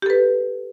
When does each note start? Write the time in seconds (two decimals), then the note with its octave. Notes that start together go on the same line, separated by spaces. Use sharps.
0.02 G4
0.06 A4
0.10 B4